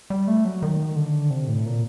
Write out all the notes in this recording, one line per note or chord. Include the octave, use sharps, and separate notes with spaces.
G3
A3
F#3
D#3
D3
C3
A2
A#2